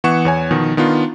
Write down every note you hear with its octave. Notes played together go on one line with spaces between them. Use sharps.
E3 B3 F#5 C#6 C#7 E7
E2 C#5 G#5
B2 D#3 F3
D#3 B3 D4 F4